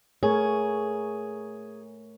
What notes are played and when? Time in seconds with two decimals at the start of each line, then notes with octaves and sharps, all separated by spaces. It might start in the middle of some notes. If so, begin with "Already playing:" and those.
0.23 A3 G#4 A#4 C#5